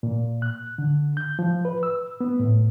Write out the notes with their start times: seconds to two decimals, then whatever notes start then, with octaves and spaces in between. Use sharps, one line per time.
0.03 A#2
0.42 F#6
0.78 D3
1.17 G6
1.39 F3
1.65 B4
1.83 E6
2.21 B3
2.40 A2